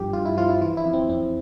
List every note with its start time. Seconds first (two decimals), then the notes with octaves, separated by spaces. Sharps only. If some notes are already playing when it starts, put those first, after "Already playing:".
Already playing: G2 F3 G4
0.13 G2 F4
0.25 E4
0.37 F3 F4
0.49 E4
0.61 E3 F4
0.77 E4
0.86 F2
0.93 C4
1.09 F2 C4